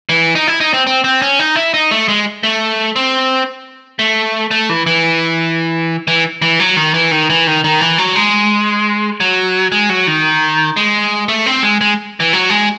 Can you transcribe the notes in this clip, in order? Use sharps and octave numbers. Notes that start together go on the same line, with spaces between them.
E3
D#4
E4
D#4
C4
C4
C4
C#4
D#4
E4
D#4
A3
G#3
A3
C4
A3
A3
E3
E3
E3
E3
F#3
D#3
E3
D#3
E3
D#3
D#3
E3
F#3
G#3
F#3
G#3
F#3
D#3
G#3
A3
C4
G#3
G#3
E3
F#3
G#3